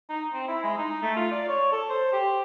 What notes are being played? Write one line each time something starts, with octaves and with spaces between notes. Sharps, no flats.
D#4
C4
E4
G#3
D#4
A3
F4
D5
C#5
A4
C5
G4